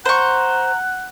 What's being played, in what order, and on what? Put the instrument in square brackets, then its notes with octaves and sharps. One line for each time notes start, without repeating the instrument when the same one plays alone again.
[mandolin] C5 C#6 [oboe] F#5 [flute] A#5